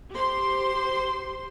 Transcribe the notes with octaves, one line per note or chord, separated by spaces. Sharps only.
G4 C5 C6